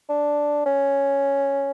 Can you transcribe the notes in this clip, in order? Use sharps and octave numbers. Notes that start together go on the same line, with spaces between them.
D4
C#4